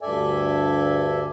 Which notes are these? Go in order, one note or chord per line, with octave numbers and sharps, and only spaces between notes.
D2 G2 A4 D5 E5 G#5